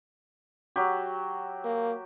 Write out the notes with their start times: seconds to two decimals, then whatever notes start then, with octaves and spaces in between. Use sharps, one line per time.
0.76 F#3 G4
1.65 A#3